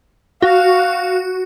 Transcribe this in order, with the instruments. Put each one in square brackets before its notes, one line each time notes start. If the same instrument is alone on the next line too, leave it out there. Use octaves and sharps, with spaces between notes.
[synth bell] F#4 [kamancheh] F5